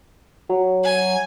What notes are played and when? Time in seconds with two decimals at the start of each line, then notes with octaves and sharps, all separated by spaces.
0.49 F#3
0.84 G#5